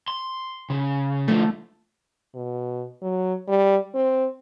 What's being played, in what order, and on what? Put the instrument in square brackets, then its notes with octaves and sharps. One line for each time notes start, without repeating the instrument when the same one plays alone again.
[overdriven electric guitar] C6
C#3
[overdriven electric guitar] D3 F3 [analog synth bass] A3
[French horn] B2
F#3
G3
C4